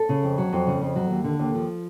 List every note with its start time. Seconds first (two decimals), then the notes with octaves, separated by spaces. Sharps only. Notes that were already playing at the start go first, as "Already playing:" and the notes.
Already playing: A4
0.09 C#3
0.23 F2
0.38 F#3
0.53 F2
0.67 C#3
0.81 F2
0.96 F#3
1.11 D#2
1.24 D3
1.39 D#2
1.55 F3